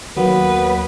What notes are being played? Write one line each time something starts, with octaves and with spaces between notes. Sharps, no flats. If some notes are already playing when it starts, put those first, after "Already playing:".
D#2 F#3 A#3 B3 B4